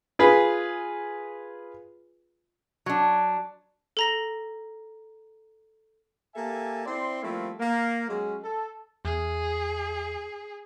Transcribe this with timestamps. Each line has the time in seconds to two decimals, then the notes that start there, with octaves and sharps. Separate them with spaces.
0.19 F4 G#4 B4
2.86 F#3 D4
3.97 A4 A#5 A#6
6.35 A#3 G4 A4 E5 G#5 A5
6.86 C4 E4 C5 D5 C6
7.22 F3 G3 A3 A#3 C4 E4
7.60 A#3
8.09 F#3 G#3 C#4
8.43 A4
9.05 E2 G#4